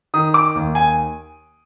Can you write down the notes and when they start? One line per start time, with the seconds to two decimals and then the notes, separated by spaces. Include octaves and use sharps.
0.14 D#3 D#6
0.34 D6
0.55 D#2
0.75 G#5